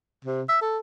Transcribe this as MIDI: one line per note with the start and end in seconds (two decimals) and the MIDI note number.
0.24 0.42 48
0.49 0.57 76
0.61 0.79 69